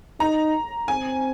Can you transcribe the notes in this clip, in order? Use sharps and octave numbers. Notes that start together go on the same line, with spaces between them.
D#4 A#5
C4 G#5